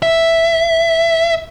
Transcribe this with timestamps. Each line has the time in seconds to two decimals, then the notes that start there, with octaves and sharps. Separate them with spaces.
0.02 E5